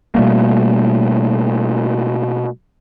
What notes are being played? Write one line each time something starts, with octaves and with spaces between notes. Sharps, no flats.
B2 G3 A3 A#3